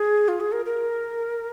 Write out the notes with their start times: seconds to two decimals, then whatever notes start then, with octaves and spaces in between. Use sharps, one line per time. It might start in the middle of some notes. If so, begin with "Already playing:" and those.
Already playing: G#4
0.28 F4
0.40 G#4
0.52 A#4
0.65 A#4